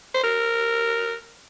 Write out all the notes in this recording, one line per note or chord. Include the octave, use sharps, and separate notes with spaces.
C5
A#4